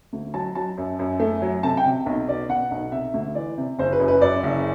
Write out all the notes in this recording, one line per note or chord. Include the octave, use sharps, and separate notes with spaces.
D2
F#3 A5
F#3 A5
F#2
F#2
A3
F#3
C3 A5
G5
C3
B1
B2 D5
B2 F#5
B1
C3 E5
D2
E3 D5
C3
F#1 C5
B4
F#2
B4
F#2 D5
F#1